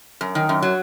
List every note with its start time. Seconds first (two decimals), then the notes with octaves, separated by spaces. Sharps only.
0.21 F#2
0.35 D#3
0.49 F#2
0.63 F#3